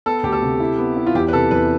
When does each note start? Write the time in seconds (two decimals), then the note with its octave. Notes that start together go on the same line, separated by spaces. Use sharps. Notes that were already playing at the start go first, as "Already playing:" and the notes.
0.06 B3 A4
0.23 D2 G4
0.32 A4
0.42 C3
0.60 E4
0.78 B3
0.97 E4
1.06 F4
1.15 E2 G4
1.28 B4
1.33 C3 A4
1.51 E2 B4